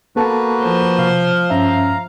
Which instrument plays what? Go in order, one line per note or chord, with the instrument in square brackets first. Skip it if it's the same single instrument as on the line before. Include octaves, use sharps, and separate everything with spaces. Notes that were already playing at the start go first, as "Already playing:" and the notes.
[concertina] A#3 F#4 B4 [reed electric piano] B3 A4 A5
[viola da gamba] F3 C5
[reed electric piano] C3 [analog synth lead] F5
[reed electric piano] G2 C#4 E5 [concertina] A#5